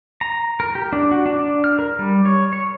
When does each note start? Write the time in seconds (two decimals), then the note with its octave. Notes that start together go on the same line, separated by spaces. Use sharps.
0.21 A#5
0.60 A#4
0.75 G4
0.93 D4
1.11 F#4
1.26 D4
1.39 D4
1.64 F6
1.79 A#4
1.99 G3
2.25 C#5
2.53 C#5